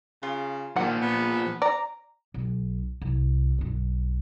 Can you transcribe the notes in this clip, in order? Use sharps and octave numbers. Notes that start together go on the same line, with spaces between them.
C#3 F4
A#2 D#3 F3 F#5
B3
D5 A#5
B1
C2
B1 G2